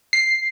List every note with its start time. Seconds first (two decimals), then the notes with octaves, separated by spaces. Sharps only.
0.13 C7